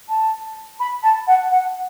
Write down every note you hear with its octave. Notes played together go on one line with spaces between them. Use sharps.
A5
B5
A5
F#5
F#5